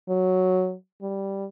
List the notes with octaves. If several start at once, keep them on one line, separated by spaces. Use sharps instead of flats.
F#3
G3